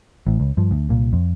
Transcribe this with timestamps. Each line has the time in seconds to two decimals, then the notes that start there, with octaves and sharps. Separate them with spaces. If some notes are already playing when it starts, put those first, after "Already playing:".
0.27 A1 A2
0.40 C#2
0.57 G2 F3
0.71 D2
0.89 C2 A#2
1.13 F2